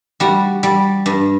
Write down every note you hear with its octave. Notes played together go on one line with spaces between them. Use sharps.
G3 F#4
G3
G2